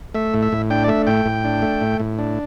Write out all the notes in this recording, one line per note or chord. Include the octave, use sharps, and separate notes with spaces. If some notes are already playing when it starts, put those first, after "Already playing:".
A3 E5
A2
E5
A2
D4 G5
D5
A3 E5
A2 G5
A2
D4
A3
A2
A2
D4